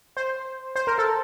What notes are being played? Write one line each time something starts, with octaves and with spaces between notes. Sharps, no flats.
C5
C5
A#4
A4